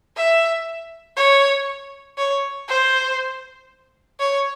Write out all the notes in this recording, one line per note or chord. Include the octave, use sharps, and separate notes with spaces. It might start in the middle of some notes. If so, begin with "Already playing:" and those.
E5
C#5
C#5
C5
C#5